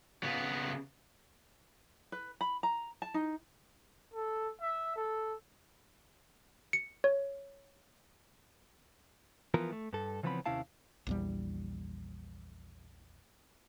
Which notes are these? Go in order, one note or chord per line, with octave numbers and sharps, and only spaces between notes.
C#3 B3
B4
B5
A#5
A5
D#4
A4
E5
A4
C#7
C#5
E3 F3 B3 F4 A#4
A3
G2 A4
C#3 E3 F3 B3 C4 B5
D#2 C3 C#4 E4 F5 A5
A#1 E2 G3